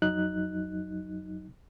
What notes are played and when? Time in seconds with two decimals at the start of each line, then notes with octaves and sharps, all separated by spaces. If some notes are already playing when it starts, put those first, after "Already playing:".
0.02 F2 F#3 D#4 F#6